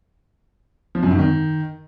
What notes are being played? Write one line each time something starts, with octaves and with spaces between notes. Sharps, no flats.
F3
F#2
G#2
D#3